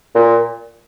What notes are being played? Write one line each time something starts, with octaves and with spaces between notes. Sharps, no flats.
A#2